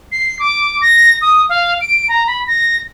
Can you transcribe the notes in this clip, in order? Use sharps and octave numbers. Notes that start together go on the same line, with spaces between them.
C7
D6
A#6
D#6
F5
D7
A#5
B5
A#6